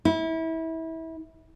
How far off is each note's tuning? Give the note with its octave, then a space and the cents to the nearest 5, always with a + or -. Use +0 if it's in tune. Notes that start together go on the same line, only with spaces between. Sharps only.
E4 -25